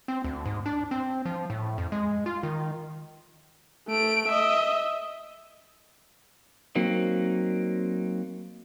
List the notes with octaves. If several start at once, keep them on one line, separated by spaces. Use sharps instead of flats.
C4
D2
G#2
D4
C4
F3
A2
F2
G#3
F4
D#3
A3 D7
D#5 E5
F#3 A#3 C4 D#4